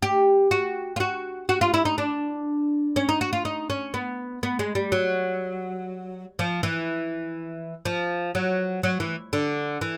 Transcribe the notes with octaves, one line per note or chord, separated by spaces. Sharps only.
G4
F#4
F4
F#4
F#4
F4
E4
D#4
D4
C#4
D#4
F#4
F4
D#4
C#4
B3
B3
G#3
G3
F#3
F3
E3
F3
F#3
F#3
E3
D3
E3